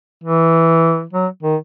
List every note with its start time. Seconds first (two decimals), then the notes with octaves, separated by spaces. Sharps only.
0.24 E3
1.13 F#3
1.43 D#3